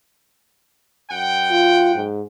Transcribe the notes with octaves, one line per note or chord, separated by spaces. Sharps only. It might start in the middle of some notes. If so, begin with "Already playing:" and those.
F#2 F#5 G5
F4
G#2